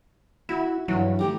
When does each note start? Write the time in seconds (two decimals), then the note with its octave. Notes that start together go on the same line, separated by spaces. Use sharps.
0.49 E4 F#4 E5
0.88 G2 E3 F#3 G3
1.19 E3 A3 G4 A#5